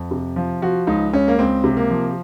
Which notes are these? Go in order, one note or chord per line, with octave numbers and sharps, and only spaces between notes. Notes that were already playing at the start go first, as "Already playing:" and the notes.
Already playing: F2
C3
F3
F3 F#4
C#2 D#4
C#2 C#4
A#3
C#2 C4
C3
A#3
F3